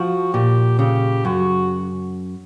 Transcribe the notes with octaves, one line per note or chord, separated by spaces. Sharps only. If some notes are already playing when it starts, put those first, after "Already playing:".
Already playing: F3 F#4
A#2 G4
C#3 G4
F#2 F#4